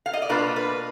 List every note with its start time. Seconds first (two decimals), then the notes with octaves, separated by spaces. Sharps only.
0.06 F5
0.13 D#5
0.22 D5
0.29 B2 A#3 D4 F4 B4
0.56 B4